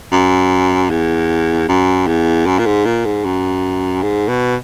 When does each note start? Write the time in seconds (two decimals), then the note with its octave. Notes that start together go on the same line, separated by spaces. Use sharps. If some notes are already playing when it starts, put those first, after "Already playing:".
0.11 F#2
0.90 E2
1.68 F#2
2.07 E2
2.47 F#2
2.59 A#2
2.66 G#2
2.85 A#2
3.05 G#2
3.25 F#2
4.03 G#2
4.28 B2